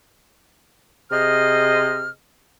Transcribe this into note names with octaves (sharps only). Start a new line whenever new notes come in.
C3 G#4 C5 D#5 F6